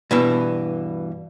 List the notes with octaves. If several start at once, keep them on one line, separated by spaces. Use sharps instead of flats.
G2 B2 E3